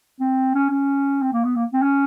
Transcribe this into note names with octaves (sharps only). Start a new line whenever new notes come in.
C4
C#4
C#4
C4
A#3
B3
A#3
C4
C#4